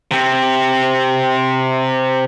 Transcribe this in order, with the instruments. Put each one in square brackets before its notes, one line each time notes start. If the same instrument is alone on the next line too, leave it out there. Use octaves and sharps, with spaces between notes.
[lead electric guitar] C3 C4